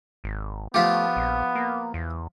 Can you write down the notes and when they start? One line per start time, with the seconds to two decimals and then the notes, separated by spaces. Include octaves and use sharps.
0.24 G#1
0.74 F3 A3 B3 F4 G4
1.17 A#1
1.55 A#3
1.94 E2